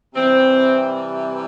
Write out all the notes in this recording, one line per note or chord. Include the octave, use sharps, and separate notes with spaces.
C3 E3 G3 C4